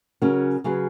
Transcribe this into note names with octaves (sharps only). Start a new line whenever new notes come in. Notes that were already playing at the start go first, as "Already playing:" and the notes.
C#3 F#3 C#4 F#4 A#4
C#3 F#3 C#4 G#4 B4